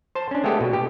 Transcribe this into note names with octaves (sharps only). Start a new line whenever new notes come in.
C5 A5
C#4 D4
G#3 A3 B3 G4 A4 D#5
B2
G4